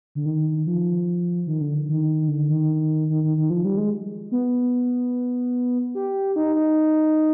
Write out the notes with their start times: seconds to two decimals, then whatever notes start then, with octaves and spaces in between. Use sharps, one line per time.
0.15 D3
0.26 D#3
0.67 F3
1.47 D#3
1.61 D3
1.89 D#3
2.28 D3
2.49 D#3
3.10 D#3
3.24 D#3
3.38 D#3
3.50 F3
3.65 G3
3.78 G#3
4.32 B3
5.95 G4
6.36 D#4
6.56 D#4